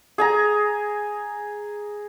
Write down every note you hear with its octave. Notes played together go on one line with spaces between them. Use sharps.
G#4 G#5 A#5